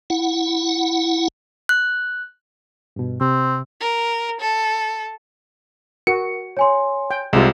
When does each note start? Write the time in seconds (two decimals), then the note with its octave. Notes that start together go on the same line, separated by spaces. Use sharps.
0.10 E4 F#5
1.69 F#6
2.96 G2 B2
3.21 C3 C4
3.80 A#4
4.41 A4
6.07 F#4 A#4 C#7
6.57 C#5 G#5 C6
7.11 G5
7.33 C2 C3 G#3 F4 E7